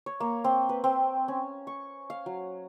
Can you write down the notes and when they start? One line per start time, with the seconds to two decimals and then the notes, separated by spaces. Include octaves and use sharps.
0.06 C#5
0.20 A#3
0.44 C4
0.69 B4
0.84 C4
1.28 C#4
1.67 C#6
2.10 F5
2.26 F#3